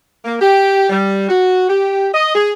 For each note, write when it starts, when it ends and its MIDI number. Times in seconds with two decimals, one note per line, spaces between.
0.25 0.36 58
0.41 0.89 67
0.90 1.28 55
1.29 1.65 66
1.70 2.08 67
2.14 2.34 75
2.35 2.51 68